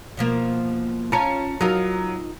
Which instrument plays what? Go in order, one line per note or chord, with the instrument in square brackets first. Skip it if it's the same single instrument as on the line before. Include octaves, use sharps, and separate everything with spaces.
[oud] B2 F3 A#3
[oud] C#4 F4 [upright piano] A5 A#5 C#7
[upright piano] F#3 [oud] D#4 F4 A#4